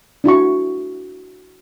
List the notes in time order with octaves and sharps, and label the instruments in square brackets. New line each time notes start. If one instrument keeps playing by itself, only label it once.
[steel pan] D4 E4 F#4 C#6